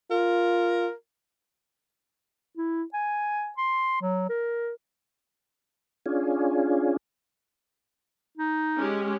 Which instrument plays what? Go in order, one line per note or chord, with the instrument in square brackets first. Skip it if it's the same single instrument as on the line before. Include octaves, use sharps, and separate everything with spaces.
[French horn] F4 [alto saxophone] A#4
[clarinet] E4
G#5
C6
F#3
A#4
[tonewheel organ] C#4 D4 F4 G#4
[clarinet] D#4
[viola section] G#3 C#4 G4